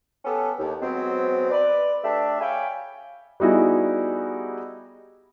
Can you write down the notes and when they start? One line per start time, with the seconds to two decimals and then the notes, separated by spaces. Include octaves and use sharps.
0.24 B3 C#4 G4 A4
0.58 D#2
0.81 F#3 G#3 B3 C4
1.51 B4 D5
2.03 A3 D4 G4 E5
2.40 C#5 E5 F5 G5 G#5 B5
3.40 G3 B3 D#4 E4 F#4 G#4